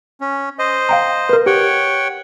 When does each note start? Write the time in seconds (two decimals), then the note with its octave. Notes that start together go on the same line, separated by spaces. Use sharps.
0.21 C#4
0.59 C5 D#5
0.89 F5 G5 A#5
1.29 A#4 B4
1.46 G4 C#5 F#5 G5